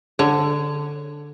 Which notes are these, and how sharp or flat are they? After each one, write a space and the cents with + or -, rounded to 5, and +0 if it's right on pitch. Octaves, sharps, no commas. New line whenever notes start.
D3 +0 C#5 +0